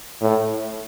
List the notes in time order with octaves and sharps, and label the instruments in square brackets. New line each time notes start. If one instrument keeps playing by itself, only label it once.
[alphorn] A2